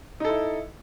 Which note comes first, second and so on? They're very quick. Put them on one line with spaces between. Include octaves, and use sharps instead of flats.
D#4 A4 E4